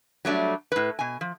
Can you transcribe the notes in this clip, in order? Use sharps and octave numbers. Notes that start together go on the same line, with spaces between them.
F#3 G3 A3 D4
A2 B4
B2 G#5
F3